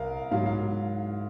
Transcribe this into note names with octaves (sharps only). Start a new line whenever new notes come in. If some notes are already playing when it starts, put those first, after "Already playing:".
Already playing: C2 A#4 F5
G#2 F#3 F5
F5